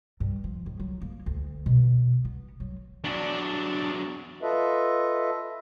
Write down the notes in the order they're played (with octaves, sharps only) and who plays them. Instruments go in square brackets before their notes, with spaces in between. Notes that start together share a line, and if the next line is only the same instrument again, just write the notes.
[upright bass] G2
F3
C#2
F#3
A#3
D2
B2
B3
F#3
[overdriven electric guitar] E2 F#3 [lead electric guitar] D4 D5
[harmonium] F4 A4 B4 D#5 E5